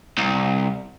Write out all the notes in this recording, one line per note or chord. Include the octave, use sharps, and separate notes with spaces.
C2